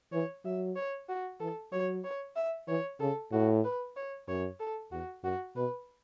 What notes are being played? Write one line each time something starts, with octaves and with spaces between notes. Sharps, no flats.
E3 C#5
F#3 E5
C#5
F#4
E3 A4
F#3 C#5
C#5
E5
E3 C#5
C#3 A4
A2 F#4
B4
C#5
F#2 C#5
A4
E2 F#4
F#2 F#4
B2 B4